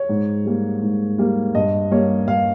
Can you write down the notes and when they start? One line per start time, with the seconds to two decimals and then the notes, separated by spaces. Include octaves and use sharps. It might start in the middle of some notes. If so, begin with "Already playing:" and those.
Already playing: C#5
0.09 G#2
0.45 G3 A#3
0.82 G#2
1.18 G3 A#3
1.55 G2 D#5
1.91 G3 A#3 C#5
2.28 G2 F5